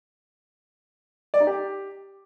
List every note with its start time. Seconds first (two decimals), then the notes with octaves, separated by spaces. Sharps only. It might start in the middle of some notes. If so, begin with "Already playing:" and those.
1.34 D5
1.40 D#4
1.47 G4